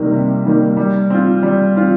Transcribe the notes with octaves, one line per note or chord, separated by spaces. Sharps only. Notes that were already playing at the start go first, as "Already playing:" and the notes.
Already playing: C3 D#3 G3 A#3
C3
D#3 G3 A#3
G3
C4 F4
G3
C4 F4